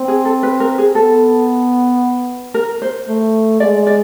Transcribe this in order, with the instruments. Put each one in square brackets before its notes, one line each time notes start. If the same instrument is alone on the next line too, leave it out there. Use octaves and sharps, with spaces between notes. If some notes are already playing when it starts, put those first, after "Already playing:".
Already playing: [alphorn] C4
[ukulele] G#4
A4
B4
A#4
G#4
[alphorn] B3 [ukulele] A4
[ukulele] A#4
C5
[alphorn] A3
[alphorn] G#3 [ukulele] D5
[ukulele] D5